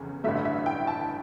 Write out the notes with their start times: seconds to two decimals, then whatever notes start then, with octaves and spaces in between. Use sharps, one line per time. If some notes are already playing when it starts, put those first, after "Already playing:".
Already playing: F1 E2 C#3
0.24 A1 G2 D3 A3 E5
0.45 E5
0.66 G5
0.87 A5